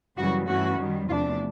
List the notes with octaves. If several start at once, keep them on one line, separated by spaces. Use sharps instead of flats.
F#2 C#3 E3 G3 F#4
G2 E3 A3 C#4 F#4
F#2 D#3 G3
E2 C3 F3 A3 D4 F4